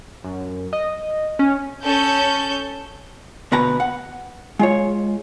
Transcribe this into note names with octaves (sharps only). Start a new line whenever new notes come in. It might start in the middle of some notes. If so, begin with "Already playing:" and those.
F#2
D#5
C#4
C#4 A4 G6
D2 B2 B4 A#5
F#5
G#3 F4 C#5